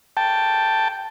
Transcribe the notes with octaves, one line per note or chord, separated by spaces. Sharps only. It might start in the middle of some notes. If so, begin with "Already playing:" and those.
G5 A5